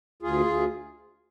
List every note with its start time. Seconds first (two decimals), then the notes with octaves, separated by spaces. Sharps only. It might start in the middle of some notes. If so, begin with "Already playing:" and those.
0.22 D2 F4 G#4
0.46 D2